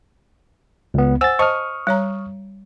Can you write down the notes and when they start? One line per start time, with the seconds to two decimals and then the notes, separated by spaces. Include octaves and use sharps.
0.94 C#2 B3
1.21 C5 F#5 G#5 E6 A6
1.39 C5 D#5 A5 C#6 D#6 F6
1.87 G3 C#5 A#5